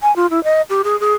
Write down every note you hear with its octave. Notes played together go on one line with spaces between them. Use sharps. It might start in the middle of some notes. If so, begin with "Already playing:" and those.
G#5
F4
E4
D#5
G4
G#4
G#4